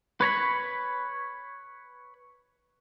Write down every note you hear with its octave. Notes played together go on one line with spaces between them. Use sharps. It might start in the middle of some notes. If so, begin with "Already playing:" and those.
B4 C#5 A#5 B5